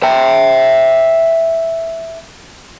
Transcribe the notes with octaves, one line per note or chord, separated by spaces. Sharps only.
E5 G5